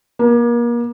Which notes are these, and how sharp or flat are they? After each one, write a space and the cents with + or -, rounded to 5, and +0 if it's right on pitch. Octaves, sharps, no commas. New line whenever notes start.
A#3 +35